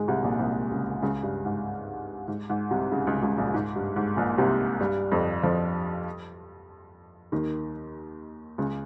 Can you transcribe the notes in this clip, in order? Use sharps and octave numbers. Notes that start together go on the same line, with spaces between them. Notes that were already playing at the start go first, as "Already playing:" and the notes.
Already playing: G#2 G#3
C2 C3
A#1 A#2
C2 C3
C#2 C#3
C#2 C#3
G2
G#2
G#2
G#2
C2 C3
C#2 C#3
C#2 C#3
C#2 C#3
A#1 A#2
G#2
G2
G#2
A#1 A#2
C2 C3
G2 G3
F2 F3
F2 F3
D#2 D#3
C#2 C#3